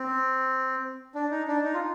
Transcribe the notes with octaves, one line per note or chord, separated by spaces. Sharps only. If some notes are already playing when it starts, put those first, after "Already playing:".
Already playing: C4
D4
D#4
D4
D#4
F4